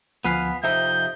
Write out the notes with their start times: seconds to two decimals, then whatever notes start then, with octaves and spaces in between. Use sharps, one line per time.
0.25 D2 F3 B3 B4 F5 G#5
0.64 F2 C3 D#4 E5 G6